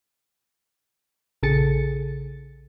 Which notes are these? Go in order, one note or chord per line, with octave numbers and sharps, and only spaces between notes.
A#1 C#3 G#4 A4 A6 C#7